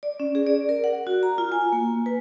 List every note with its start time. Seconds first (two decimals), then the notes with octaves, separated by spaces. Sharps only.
0.03 D5
0.20 C#4
0.35 G#4
0.47 D5
0.69 A#4
0.84 F#5
1.07 F#4
1.23 A#5
1.38 F4
1.52 G#5
1.72 A#3
2.06 B4